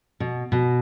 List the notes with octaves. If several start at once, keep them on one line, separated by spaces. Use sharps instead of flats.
B2
B2